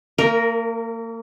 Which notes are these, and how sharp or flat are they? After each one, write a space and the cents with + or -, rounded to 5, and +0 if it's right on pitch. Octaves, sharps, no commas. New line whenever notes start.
A#3 -35 A#4 +0